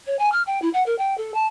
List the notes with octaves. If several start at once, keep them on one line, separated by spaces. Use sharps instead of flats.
C#5
G#5
F6
G5
E4
F#5
A#4
G5
A4
A5